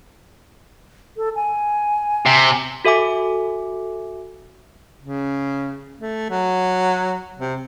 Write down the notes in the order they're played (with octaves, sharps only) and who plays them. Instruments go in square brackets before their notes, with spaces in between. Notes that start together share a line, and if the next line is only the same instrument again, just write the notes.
[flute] A4
G#5
[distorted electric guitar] C3
[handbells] F#4 A4 E5 G#5 D6
[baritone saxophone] C#3
A3
F#3
C3